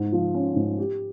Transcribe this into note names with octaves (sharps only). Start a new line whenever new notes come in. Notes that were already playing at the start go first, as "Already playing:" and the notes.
Already playing: G#2
F3
C#4
G#2
G4